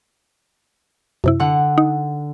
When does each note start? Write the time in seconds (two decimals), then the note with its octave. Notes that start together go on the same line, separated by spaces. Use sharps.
1.24 F#2 C3 E4
1.40 D3 F#5
1.78 D#4